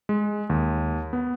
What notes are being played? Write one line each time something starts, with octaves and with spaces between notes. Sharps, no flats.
G#3
D#2
B3